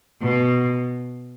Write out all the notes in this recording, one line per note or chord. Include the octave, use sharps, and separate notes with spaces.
B2